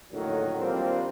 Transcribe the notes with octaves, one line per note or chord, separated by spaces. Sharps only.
A#1 A2 D3 D#3 F#3
D#3 F3 G3 A#3 C4 D4